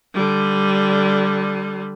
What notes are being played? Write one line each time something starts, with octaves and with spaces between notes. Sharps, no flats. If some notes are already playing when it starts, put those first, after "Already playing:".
D3 G3